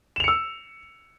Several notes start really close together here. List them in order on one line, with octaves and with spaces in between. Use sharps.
E7 F7 C#7 E6